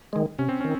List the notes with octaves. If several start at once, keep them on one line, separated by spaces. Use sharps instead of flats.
D#3 G#3
C3 C#4
C4
D#3 C#4